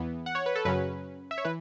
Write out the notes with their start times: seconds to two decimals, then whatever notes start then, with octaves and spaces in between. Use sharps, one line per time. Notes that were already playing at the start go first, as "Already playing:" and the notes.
Already playing: E2 E3 B3
0.26 F#5
0.35 C#5
0.46 B4
0.55 A4
0.65 F#2 C#3 F#3 C#4 B4
1.31 E5
1.38 C#5
1.45 E3 B4